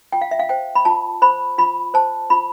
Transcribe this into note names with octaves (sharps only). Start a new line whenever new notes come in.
F4 G5
F5
E5
F5
C5 G5
B5
F4 A5
C5 B5
F4 B5
C5 A5
F4 B5